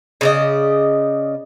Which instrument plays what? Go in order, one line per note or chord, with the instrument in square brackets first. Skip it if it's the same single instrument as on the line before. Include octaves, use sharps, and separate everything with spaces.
[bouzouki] C#3 D5 D#5